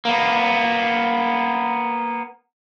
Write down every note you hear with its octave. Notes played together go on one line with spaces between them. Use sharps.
A#3 B3